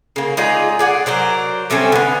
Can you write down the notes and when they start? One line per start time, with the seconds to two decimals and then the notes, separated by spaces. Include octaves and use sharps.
0.16 C#3 A#3
0.37 G#3 D#4 F4 D5
0.79 G#4 D5 F#5
1.06 F#3 A#4 C5 D5
1.70 G3 A3 C4 C#4
1.92 D3 B3